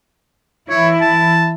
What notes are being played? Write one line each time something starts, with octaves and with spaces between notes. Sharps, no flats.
E3 E4 C#5
A5